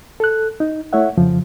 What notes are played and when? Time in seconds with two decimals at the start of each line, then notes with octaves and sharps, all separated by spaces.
0.20 A4 F#6
0.60 D#4
0.93 A3 E4 C#5 E5 F#5
1.17 F2 C#3 F3